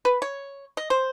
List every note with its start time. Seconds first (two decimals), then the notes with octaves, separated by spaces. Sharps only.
0.05 B4
0.22 C#5
0.77 D#5
0.90 C5